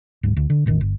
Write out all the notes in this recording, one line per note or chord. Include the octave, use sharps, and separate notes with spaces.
D1 G#2
D2
D3
E1 A1 A2 D#3
G1